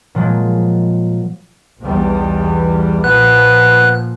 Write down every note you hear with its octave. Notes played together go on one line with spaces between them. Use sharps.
A#2 F3 F#3 G#3
B1 E2 G3
A#2 F3 B3 F#6